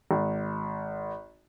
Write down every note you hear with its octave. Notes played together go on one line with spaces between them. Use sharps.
G#1